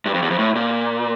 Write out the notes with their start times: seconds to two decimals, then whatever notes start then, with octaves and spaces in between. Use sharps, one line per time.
0.06 G2
0.14 F2
0.22 E2
0.30 F2
0.39 A2
0.55 A#2